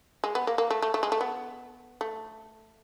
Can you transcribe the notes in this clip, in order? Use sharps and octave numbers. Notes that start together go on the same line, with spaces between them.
G#3
B3
A#3
A#3
A3
A3
A3
G#3
A3
B3
A3